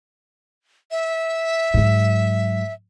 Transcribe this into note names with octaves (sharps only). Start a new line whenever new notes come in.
E5
G#2 F#3